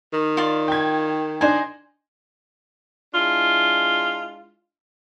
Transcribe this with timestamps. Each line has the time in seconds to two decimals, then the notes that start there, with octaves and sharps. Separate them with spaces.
0.13 D#3
0.37 F4 D5
0.68 G5 G#6
1.41 D4 D#4 C5 G#5
3.14 G#3 D4 E4 F4